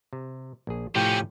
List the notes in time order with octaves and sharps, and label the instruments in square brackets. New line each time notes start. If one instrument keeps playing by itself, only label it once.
[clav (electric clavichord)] C3
A#1 G#4
[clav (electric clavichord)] A2 F3 G5 [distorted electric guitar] C3 C#4 [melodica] G4